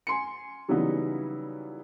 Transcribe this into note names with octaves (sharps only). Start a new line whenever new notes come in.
G#5 C6 C#7
C#3 E3 F#3 G3 B3 D#4